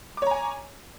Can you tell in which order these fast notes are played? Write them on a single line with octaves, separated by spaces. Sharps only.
D6 C#5 A#5 G#5